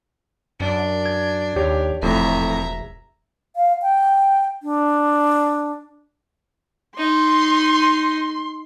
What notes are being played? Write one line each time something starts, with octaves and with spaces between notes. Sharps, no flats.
F#2 D4
G#6
D#2 G4 C#5
E1 F2 A2 E5 A#5
F5
G5
D4
D#4 C6